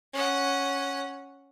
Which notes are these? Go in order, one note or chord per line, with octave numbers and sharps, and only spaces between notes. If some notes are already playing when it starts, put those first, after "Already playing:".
C#4 F#5